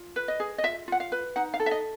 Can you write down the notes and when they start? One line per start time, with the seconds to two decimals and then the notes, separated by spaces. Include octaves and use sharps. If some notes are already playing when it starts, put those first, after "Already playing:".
Already playing: F4
0.16 B4
0.28 D#5
0.40 G#4
0.58 D#5
0.63 F4 E5
0.88 F4 F#5
1.00 F5
1.12 B4
1.36 D#4 F#5
1.54 F5
1.60 A4
1.66 E5
1.71 D#5